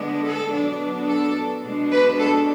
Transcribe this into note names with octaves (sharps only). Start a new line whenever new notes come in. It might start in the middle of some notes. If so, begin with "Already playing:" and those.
Already playing: D3 G#3 B3 D4
A4
B2 F#3 B3 D4
A4
B2 G#3 D4
B4
A4